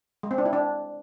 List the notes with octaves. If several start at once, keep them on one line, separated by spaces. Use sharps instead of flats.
G#3
C4
D4
E4
D4